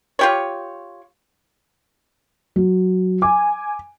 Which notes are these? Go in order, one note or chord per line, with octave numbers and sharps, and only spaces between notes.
F4 G4 C#5
F#3
G#5 D6